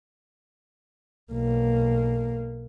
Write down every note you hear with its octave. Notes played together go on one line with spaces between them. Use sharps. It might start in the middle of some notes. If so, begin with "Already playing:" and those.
B1 A#3